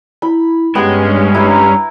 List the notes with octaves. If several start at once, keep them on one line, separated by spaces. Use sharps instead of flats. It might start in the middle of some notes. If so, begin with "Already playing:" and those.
E4 B5
G2 G#3 B3 C#4 G4 G5
E4 B4 A#5